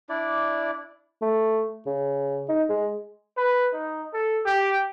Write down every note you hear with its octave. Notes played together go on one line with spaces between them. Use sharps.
D4 E4 D5
A3
C#3
D#4
G#3
B4
D#4
A4
G4